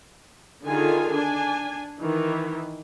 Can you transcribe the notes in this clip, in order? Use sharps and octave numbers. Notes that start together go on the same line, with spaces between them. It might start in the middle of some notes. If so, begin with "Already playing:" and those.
D3 D#3 F4 G#4 G#5
D4 G#5
D#3 E3